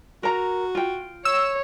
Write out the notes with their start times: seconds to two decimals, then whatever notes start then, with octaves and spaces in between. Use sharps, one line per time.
0.23 F#4 A#4 A#5
0.75 F4 G5
1.25 C#5 E6